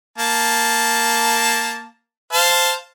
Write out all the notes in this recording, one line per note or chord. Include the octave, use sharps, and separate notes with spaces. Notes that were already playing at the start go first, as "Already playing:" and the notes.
A#3 A5
C5 F5 A5